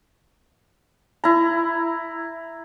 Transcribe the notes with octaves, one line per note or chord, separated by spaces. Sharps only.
E4 A#5